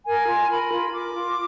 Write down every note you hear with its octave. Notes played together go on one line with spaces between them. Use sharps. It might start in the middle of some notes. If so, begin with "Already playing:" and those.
A#4 G#5
F4
A#4 B5
F4
A#4 D6
F4